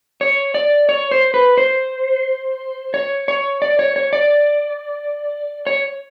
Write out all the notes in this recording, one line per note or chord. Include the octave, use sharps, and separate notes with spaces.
C#5
D5
C#5
C5
B4
C5
C#5
C#5
D5
C#5
C#5
D5
C#5